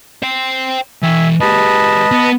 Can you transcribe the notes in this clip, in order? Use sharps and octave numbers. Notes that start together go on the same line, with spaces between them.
C5 G5
E3 E5 G5 G#5
G#3 G4 B4 D#5 A5
B3